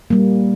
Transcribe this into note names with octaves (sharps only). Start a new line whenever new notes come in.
G3 A#3